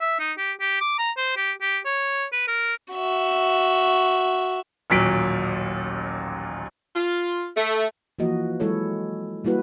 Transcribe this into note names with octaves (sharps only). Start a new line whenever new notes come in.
E5
D#4
G4
G4
D6
A#5
C5
G4
G4
C#5
B4
A#4
F#4 E5
A1 D#2 A#2 F#3 B6 D7
F4
A3
E3 F3 A#3 F#4 D#5
F#3 G#3 E4 A4 C#5
G3 A#3 E4 F#4 B4